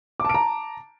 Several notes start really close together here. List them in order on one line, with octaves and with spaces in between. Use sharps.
D6 A5 D7 A#5